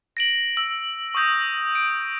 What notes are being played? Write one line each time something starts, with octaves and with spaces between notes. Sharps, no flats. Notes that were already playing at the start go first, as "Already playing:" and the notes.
A#6 D7 F#7
E6
C#6 D#6 G6 A#6
D7